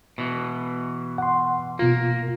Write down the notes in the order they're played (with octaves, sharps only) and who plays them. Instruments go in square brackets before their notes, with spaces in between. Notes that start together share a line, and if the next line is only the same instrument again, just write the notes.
[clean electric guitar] B2 E3
[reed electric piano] F#5 C6
[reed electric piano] B2 F4 [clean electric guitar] A#3